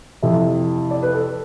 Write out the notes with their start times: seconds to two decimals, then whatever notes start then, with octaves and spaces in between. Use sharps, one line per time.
0.22 F2 C3 E3 E5
0.91 D5
1.03 B4
1.14 A4